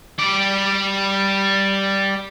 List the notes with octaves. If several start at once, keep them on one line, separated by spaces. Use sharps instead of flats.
G3 D5